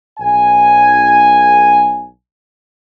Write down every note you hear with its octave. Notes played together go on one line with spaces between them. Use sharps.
B1 G#5